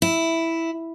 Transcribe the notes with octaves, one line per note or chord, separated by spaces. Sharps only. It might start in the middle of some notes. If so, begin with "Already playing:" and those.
E4